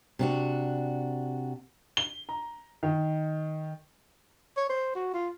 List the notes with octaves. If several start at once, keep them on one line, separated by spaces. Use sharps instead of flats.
C3 D4 F#4
G7
A#5
D#3
C#5
C5
F#4
F4